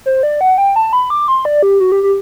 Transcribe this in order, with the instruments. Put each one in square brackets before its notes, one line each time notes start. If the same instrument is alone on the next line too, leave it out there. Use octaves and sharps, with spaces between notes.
[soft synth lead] C5
D5
F#5
G5
A5
B5
D6
C6
D5
G4
F#4
G4
G4